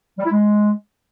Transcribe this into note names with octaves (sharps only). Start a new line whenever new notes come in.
G3
E4
G#3